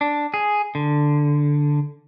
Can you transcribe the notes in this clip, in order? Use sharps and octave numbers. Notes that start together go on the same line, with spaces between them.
D4
G#4
D3